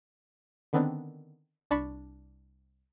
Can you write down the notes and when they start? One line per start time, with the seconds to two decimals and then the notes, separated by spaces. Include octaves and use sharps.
0.73 D3 D#3 B3 C4 D4
1.71 C2 D4 A5 B5 C#6 B6